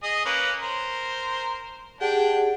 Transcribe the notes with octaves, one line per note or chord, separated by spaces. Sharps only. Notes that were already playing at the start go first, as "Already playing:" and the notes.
G#4 D#5 D#6
A#3 C#4 B4
A#4 C5
D4 G4 G#4 F#5 G5